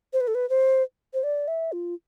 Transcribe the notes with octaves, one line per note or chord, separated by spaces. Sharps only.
C5
B4
A4
B4
C5
C5
D5
E5
F4